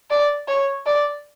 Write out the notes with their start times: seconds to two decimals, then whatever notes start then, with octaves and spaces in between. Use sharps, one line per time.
0.10 D5
0.48 C#5
0.86 D5